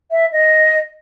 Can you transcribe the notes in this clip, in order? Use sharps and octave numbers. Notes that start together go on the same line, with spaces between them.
E5
D#5